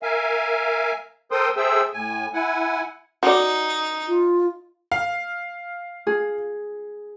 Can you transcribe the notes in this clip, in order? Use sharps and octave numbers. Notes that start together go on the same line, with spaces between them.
A#4 E5 F5 G#5
A4 A#4 C5 G5 C6 D#6
G#4 A4 C5 E5 G5 E6
A2 G#5
E4 F#5 G#5
D#4 F#4 D5
F4
F5
G#4